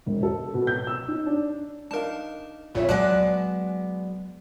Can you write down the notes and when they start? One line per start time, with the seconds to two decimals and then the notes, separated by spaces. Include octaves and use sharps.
0.06 E1
0.23 A4
0.54 B2
0.67 G6
0.87 E6
1.08 D#4
1.26 D4
1.91 D4 D#4 A#4 F5 A5
2.75 A#1 F2 A#2 F4 C#5 E5
2.89 C#2 F#3 G#3 B3 D5 G#5 A5 F#6